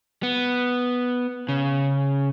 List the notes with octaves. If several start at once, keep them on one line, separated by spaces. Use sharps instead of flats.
B3
C#3